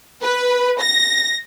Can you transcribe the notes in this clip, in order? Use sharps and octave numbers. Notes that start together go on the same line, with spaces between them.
B4
A#6